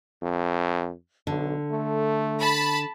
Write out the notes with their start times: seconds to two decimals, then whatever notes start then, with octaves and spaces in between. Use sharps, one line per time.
0.22 F2
1.27 B1 D3
1.71 A3
2.40 A5 B5